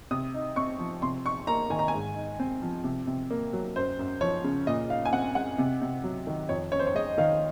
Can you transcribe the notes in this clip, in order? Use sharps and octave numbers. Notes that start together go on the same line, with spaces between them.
C3 D#6
D#4
C4 C#6
F3
C3 C6
D#4 C#6
A#3 A#5
D#3 G#5
A#5
G#5
G#2
D#4
C4
F3
C3
C3
A#3
F#3
F#2 C5
F#2
F3 C#5
C#3
A#2 D#5
D#4 F5
G#5
C4 F#5
G#3 F#5
C3
C3
F#3
D#3
F2 C#5
C#4 C#5
C5
C#5
G#3 D#5
D#3 F5